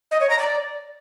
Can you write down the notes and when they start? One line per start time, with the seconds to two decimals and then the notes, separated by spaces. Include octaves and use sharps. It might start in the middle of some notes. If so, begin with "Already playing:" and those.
0.11 D#5
0.21 C#5
0.30 A#5
0.39 D5